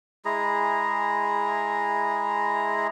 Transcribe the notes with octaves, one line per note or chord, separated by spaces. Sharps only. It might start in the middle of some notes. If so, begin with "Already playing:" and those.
G#3 E4 G#4 A#5